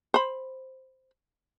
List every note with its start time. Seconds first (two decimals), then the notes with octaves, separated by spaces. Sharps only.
0.14 C5 B5